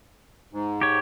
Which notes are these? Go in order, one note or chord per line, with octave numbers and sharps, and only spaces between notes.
G#2
G4 C#5